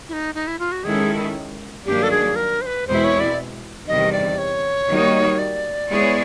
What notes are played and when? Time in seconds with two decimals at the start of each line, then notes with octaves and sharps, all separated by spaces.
0.09 E4
0.13 D#4
0.35 D#4
0.47 E4
0.59 F4
0.72 F#4
0.84 D#3 G#3 C#4 E4 G#4 A4
1.86 G2 D#3 F#3 A#3 D4 G4
2.03 A4
2.11 G#4
2.36 A#4
2.61 C5
2.66 B4
2.87 E2 B2 G#3 C4 E4 C5
3.04 C#5
3.20 D5
3.87 E2 C3 D#3 G3 D#5
4.12 D5
4.38 C#5
4.89 D#3 G3 A#3 D#4 F#4
5.38 D5
5.89 G#3 B3 E4 G#4 C#5